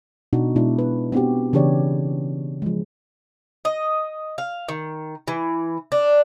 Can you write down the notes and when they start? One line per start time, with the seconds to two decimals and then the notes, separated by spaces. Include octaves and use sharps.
0.33 B2 D4 D#4 F#4
0.56 B2 G#3 D4 E4
0.79 B4
1.12 B3 C4 D4 F#4 G4
1.53 C#3 E3 D4 G4 C#5 D5
2.62 F3 G#3
3.65 D#5
4.38 F5
4.69 D#3
5.28 E3
5.92 D4